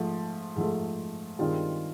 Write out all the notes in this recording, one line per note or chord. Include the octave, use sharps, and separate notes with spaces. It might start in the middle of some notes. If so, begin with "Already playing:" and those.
Already playing: G#2 F3 A3
G#2 F3 A3
G2 D#3 G#3 C4 F4